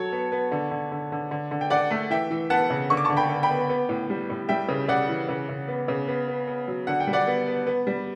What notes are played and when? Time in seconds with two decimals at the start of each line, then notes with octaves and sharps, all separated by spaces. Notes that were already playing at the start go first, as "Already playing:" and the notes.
Already playing: F#3 A4 C#5
0.12 B3
0.32 B3
0.51 D3
0.71 D3
0.92 D3
1.12 D3
1.31 D3
1.51 D3
1.61 G5
1.70 D3 D5 F#5
1.91 A3
2.10 E3 E5 G5
2.30 E3
2.50 B3 F#5 A5
2.70 C#3
2.90 D3 C#6
2.97 D6
3.05 D3 A5 C#6
3.17 G5 B5
3.29 D3
3.43 G5 B5
3.50 B3
3.69 B3
3.89 A2
4.10 G3
4.30 A2
4.49 G3 E5 G5
4.69 C#3
4.88 C#3 D5 F#5
5.09 E3
5.29 C#3
5.49 C#3
5.68 B3
5.88 C#3
6.08 B3
6.28 B3
6.48 B3
6.68 F#3
6.87 D3 F#5
7.00 G5
7.07 G3
7.13 D5 F#5
7.27 B3
7.47 B3
7.67 B3
7.87 G3